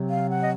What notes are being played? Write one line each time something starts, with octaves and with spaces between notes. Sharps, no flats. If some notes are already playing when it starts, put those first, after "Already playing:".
Already playing: C3 F#3 C4
F5
F#5
D#5